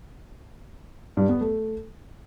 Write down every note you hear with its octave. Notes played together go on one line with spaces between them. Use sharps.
G2
B3
A3